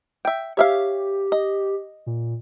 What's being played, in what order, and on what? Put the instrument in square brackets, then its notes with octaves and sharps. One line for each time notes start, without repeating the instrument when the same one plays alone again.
[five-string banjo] E5 G5
[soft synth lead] G4 [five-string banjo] C#5 E5 F5
[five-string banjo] D#5
[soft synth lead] A#2